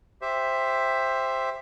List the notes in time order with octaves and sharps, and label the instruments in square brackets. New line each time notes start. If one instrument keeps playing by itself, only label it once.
[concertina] G4 C5 E5